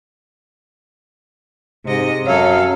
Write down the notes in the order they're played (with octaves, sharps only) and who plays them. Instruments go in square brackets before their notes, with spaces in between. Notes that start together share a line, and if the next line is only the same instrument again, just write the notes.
[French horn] G#2 [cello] C3 D#5
[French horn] F#2 [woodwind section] F#3 [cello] A4 F5